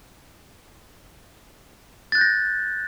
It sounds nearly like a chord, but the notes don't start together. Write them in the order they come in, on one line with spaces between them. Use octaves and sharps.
A6 F#6 G6 A#6